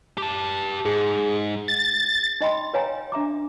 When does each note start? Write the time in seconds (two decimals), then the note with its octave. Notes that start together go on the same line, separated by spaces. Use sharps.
0.18 G4 A5
0.86 G#2 G#4
1.68 A6
2.41 D#4 D#5 G5 B5 C6
2.74 B4 C#5 F5 G5 G#5 A#5
3.12 D4 E5 A#5 D6